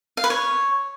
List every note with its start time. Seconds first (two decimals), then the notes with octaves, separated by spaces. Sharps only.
0.17 F5
0.24 B4
0.30 C#5